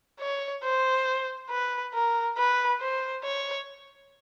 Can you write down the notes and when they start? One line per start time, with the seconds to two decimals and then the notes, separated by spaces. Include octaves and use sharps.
0.20 C#5
0.63 C5
1.50 B4
1.94 A#4
2.37 B4
2.80 C5
3.24 C#5